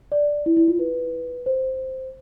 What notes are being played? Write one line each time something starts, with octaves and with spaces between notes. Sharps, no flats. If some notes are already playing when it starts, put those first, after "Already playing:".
D5
E4
E4
F4
B4
C5